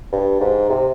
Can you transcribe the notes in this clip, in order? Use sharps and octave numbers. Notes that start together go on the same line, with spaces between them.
G2
G#2
C3